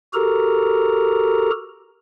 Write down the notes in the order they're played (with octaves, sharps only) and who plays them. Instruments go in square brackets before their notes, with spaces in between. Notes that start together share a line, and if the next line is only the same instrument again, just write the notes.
[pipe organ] F#4 G4 A4 A#4 A#5